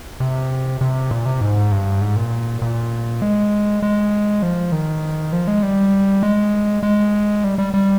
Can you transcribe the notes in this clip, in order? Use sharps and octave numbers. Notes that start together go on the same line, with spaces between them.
C3
C3
A#2
C3
G#2
G2
G#2
A#2
A#2
G#3
G#3
F3
D#3
F3
G#3
G3
G#3
G#3
G3
G3
G3